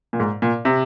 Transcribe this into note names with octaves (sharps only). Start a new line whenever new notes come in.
A#2
G#2
A#2
C3